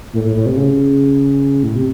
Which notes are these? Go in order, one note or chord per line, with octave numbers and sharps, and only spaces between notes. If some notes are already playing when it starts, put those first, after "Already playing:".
A2
A2
A2
C3
C#3
A2
C3